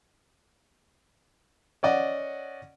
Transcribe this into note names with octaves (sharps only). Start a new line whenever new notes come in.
C#4 D5 D#5 F#5